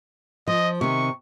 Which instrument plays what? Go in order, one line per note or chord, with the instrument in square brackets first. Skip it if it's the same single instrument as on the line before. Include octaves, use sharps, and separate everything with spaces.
[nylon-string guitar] F3 [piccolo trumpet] D#5
[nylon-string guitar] C3 D#3 [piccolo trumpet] C#6